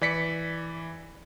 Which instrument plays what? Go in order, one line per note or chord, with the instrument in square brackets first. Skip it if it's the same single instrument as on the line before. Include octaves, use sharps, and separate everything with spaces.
[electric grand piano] E3 D5 B6 C#7